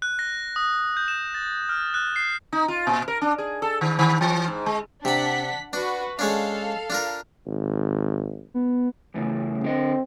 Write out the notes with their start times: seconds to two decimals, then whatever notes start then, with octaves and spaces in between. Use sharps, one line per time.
0.02 F#6
0.19 A#6
0.56 D#6
0.97 G6
1.08 E7
1.34 A6
1.69 F6
1.94 F#6
2.16 C7
2.52 D#4
2.68 F4
2.87 A#2
3.08 A#4
3.21 D4
3.38 G#4
3.62 A4
3.81 D#3
3.99 D#3
4.21 E3
4.48 G#2
4.66 G#3
5.05 C3 D4 F#5 B5 B6
5.73 D4 F#4 B4
6.19 G#3 C#4 D4 A4 F5
6.90 D4 F4 A#4
7.47 G#1
8.54 B3
9.14 E2 A2 C#3
9.64 D3 C4 D#5